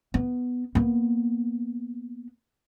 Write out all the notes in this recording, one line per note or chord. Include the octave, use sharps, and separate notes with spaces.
B3
A#3 B3